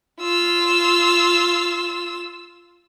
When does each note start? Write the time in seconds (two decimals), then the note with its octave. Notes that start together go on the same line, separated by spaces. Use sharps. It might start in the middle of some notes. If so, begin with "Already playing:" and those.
0.20 F4 E6